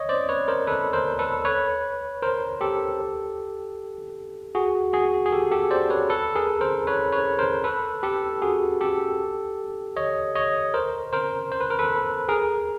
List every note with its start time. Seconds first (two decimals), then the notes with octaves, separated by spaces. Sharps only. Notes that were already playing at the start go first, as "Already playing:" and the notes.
Already playing: C#5 D#5
0.09 C5 D5
0.29 B4 C#5
0.48 A#4 C5
0.67 A4 B4
0.93 A#4 C5
1.19 A4 B4
1.45 B4 C#5
2.22 A#4 C5
2.61 G4 A4
4.55 F#4 G#4
4.93 F#4 G#4
5.26 G#4
5.32 G4 A4
5.51 G4 A4
5.71 C5 D5
5.90 B4 C#5
6.09 A4 B4
6.35 G#4 A#4
6.61 A#4 C5
6.87 B4 C#5
7.12 B4 C#5
7.39 A#4 C5
7.64 A4 B4
8.03 G4 A4
8.42 F#4 G#4
8.81 G4 A4
9.96 C#5 D#5
10.35 C#5 D#5
10.74 A#4 C5
11.13 A#4 C5
11.52 C5
11.61 B4
11.70 A#4
11.79 A4 B4
12.29 G#4 A#4